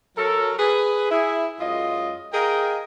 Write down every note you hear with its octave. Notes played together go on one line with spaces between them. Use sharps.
F#3 A4 A#4
G#4 B4
E4 G#4
F#2 G#3 F4 D#5
G#4 A#4 D#5 F5 G5 A#5